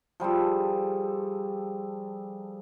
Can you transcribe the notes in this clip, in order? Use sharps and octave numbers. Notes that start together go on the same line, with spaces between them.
F3 G3 G#4 A4